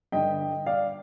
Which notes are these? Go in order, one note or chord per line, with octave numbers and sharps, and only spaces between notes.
G2 D3 D#5 G5
D5 F5